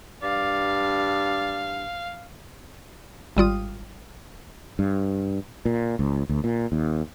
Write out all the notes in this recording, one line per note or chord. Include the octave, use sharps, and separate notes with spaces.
G2 D5 F5
G#1 G3 F4 D#6
G2
A#2
C#2
D2
A#2
D#2